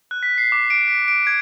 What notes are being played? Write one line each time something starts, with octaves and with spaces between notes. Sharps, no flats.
F#6
B6
C7
D6
D7
B6
D7
G#6